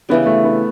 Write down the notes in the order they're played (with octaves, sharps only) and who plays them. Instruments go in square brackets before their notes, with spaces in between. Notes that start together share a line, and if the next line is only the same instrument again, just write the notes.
[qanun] C#3 E3 G3 [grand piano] B3
[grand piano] A3
B3